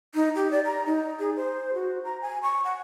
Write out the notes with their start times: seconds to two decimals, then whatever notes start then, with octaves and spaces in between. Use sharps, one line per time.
0.15 D#4
0.35 G4
0.51 D5
0.65 A#5
0.86 D#4
1.19 G#4
1.36 C5
1.74 F#4
2.04 A#5
2.21 G#5
2.43 C#6
2.65 F#5